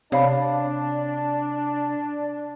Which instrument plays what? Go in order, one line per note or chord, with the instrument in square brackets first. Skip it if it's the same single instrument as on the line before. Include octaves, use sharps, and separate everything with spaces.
[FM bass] C3 [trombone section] D4 [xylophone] C#5 F5 B5